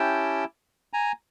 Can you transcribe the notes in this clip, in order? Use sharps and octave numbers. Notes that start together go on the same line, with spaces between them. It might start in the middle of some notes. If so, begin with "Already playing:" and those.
Already playing: C#4 E4 G4 G5 A5
G#5 A#5